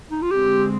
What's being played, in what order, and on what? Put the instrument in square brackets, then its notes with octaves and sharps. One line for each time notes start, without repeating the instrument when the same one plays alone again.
[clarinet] D#4
F4
[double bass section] D3 G#3 C4 [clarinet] G4